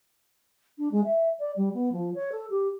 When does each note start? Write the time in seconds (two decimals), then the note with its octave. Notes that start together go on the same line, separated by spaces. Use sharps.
0.78 D4
0.91 G#3
1.04 E5
1.39 D5
1.56 G3
1.74 B3
1.92 F3
2.14 C#5
2.32 A4
2.50 G4